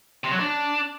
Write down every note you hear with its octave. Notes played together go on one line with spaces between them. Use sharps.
C3
F#3
D4